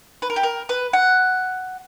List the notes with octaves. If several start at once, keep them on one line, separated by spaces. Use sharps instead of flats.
B4
A#4
G4
A#4
B4
F#5